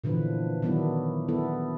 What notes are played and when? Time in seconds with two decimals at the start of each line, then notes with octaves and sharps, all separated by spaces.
0.04 A#2 D3 E3 F3 B4
0.62 D#3 F#3 B3 D4 E4
1.28 B3 E4 A4